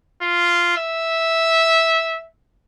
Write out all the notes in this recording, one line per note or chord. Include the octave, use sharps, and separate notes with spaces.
F4
E5